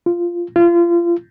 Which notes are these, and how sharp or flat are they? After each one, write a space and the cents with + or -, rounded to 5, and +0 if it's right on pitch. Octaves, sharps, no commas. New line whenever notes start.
F4 -10
F4 -30